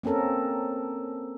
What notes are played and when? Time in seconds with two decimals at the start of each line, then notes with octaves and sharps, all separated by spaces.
0.03 A#3 C4 C#4 A4 A#4